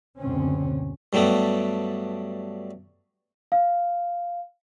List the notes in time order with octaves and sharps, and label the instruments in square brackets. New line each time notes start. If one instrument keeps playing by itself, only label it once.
[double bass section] F#1 D2 B2 D3 C4 C#4
[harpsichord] G2 F#3 G3 A3 B3
[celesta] F5